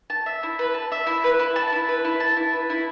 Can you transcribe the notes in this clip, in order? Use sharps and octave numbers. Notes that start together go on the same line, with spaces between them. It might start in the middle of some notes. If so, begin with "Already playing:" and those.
A5
E5
E4
B4
A5
E5
E4
B4
E4
A5
E4
B4
E4
A5
E4
B4
E4